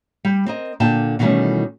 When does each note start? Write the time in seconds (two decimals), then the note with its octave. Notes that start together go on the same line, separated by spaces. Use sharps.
0.25 G3
0.46 C4 A#4 D#5
0.80 A#2 D3 G5 A5
1.19 B2 D#3 E3 G3 A3 C#4